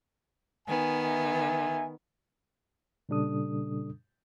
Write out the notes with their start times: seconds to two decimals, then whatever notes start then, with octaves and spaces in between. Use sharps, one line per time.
0.67 D#3 B3 G#5
1.04 E5 G#5
3.09 A#2 C#3 G3 D4 A4 D#6